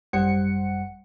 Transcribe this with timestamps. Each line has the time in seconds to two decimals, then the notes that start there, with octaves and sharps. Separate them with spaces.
0.13 G#1 F#2 G3 C5 F#5 C#7